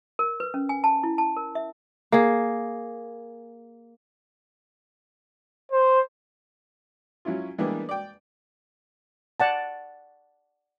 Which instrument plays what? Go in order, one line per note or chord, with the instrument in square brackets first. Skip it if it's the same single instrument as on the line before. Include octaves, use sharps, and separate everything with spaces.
[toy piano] A#4
B4
C#4
G#5
A5
E4
A5
A#4
E5
[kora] A#3 G#4
[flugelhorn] C5
[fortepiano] F#3 C#4 E4 F4
E3 G3 G#3 A#3 B3 D4
D5 G5
[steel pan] D5 F#5 A5